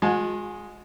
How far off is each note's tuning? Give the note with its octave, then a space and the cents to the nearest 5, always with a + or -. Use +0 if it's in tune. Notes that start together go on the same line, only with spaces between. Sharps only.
G#3 +0 F#4 -45 A5 -20